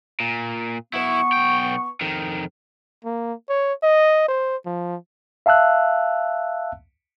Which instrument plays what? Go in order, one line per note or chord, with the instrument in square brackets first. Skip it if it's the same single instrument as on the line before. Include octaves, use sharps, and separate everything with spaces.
[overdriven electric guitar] A#2
[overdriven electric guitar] F#2 E4 [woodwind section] B3 C#6
[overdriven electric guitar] B1 G5
F2 D#3
[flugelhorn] A#3
C#5
D#5
C5
F3
[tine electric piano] E5 F5 A5 E6 F#6